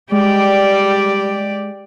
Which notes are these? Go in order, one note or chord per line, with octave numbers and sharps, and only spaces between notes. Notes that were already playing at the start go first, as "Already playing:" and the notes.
G3 G#3 G4 D5